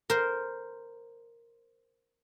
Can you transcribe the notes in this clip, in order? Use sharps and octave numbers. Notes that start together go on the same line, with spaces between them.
A#4 C5